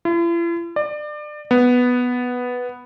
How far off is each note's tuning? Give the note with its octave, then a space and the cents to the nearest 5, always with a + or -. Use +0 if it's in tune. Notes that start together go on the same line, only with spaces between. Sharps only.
E4 +45
D5 +30
B3 +0